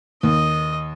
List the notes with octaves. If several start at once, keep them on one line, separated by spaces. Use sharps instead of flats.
D#2 D#5